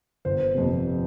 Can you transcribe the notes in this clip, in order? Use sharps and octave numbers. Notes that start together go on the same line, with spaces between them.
G1 C5
F2 C3